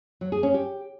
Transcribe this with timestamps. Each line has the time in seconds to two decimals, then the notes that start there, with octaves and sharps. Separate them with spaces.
0.21 F#3
0.32 G#4
0.43 C#4
0.54 G4